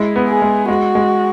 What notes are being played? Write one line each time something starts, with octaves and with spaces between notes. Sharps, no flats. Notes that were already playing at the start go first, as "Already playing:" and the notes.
Already playing: G#3 E4
B3
G#4
G#3
G#3 F#4
G#3